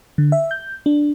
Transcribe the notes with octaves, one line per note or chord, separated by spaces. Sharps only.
D3
E5
G6
D4